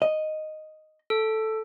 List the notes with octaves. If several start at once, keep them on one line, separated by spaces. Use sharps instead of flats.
D#5
A4